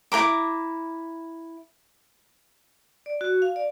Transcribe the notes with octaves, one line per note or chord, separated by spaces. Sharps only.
E4 C5 A#5 D6
D5
F#4
F5
D5